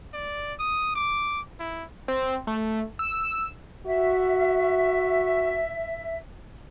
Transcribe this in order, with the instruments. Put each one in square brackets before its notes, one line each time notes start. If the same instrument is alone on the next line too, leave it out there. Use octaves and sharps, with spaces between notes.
[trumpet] D5
D#6
D6
E4
[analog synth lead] C4
A3
E6
[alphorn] F#4 [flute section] E5